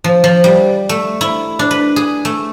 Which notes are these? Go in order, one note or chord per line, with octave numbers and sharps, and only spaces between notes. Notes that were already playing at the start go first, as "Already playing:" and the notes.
F3
F3
G3
A3
E4
D4
B4
G#4
A3